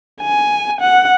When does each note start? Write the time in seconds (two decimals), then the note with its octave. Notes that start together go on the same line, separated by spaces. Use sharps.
0.21 G#5
0.81 F#5